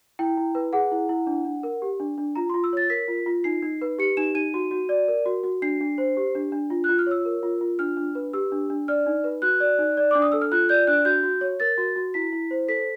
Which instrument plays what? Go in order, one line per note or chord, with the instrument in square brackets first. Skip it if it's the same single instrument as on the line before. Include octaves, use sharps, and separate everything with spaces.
[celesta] E4 G5
E4
B4
G#4 F#5
E4
E4
D4
D4
A#4
G4
D4
D4
F4 A#5
C6
F4
E6
C#5 A6
A#4 B6
F4
F4
D#4 C7
D#4
B4
G4 C#7
D#4 E7
D#4 D#7
F#4
F#4
D5
A#4
F#4
F#4
D4 C7
D4
C5
G4
D4
D4
F4
F#6
F4
F6
C#5 E6
A#4
F4
F4
D4 F6
D4
B4
G4 E6
D4
D4
D5 F6
D#4
B4
F#4 F#6
D5
D#4
D5
D4 D6
D#6
A4 E6
F6
F4 F#6
D5 G6
D4 F#6
F#4 G6
F#4
C#5
A#4 A6
F#4
F#4
E4 B6
E4
C5
A4 B6